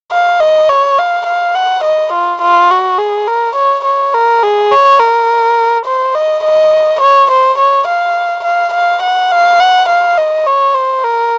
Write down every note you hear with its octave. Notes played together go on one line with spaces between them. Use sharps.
F5
D#5
C#5
F5
F5
F#5
D#5
F4
F4
F#4
G#4
A#4
C#5
C#5
A#4
G#4
C#5
A#4
C5
D#5
D#5
C#5
C5
C#5
F5
F5
F5
F#5
F5
F#5
F5
D#5
C#5
C5
A#4